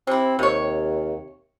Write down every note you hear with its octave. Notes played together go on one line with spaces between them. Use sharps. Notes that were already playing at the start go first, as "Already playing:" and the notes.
C3 C4 E4
D#2 C3 C#5